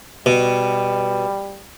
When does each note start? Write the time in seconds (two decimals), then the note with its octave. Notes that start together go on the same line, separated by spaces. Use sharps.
0.26 B2 G3